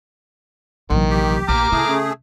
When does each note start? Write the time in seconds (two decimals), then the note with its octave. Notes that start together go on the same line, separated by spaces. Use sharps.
0.90 A#1 C3 D#3 E3 F#3
1.10 G4
1.49 A#1 A#5 D6 F6
1.72 C#3 A3 E4 G#4
1.89 C#4